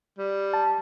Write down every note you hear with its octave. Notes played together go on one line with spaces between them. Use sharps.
G3
A5